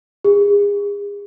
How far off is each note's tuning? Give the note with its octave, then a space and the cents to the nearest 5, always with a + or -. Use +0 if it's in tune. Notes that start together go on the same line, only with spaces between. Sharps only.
G#4 -35